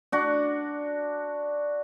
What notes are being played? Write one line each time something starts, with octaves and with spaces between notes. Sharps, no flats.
D4 F#4